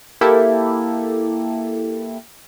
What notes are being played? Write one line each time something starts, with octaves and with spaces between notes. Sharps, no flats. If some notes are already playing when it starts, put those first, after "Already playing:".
A#3 E4 G4 A4